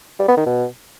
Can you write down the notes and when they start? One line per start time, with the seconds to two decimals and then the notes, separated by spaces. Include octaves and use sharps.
0.19 G3
0.28 B3
0.37 D#3
0.46 B2